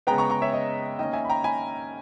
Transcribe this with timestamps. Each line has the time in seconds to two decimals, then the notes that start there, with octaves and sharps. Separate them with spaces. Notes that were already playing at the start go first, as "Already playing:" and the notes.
0.07 C#3 G#3 B3 G5 A#5
0.18 A#5 C#6
0.30 A#5 C#6
0.42 C#5 E5
0.53 D#5
0.98 D#3 A#3 C#4 D#5 G5
1.13 E5 G#5
1.25 B5
1.29 G5 A#5
1.44 G#5 B5